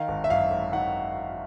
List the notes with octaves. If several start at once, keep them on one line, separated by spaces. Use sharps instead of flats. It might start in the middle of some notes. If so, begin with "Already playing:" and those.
Already playing: D#3 F5
G#1
E5
F#2 F5
G#1
D#3 F#5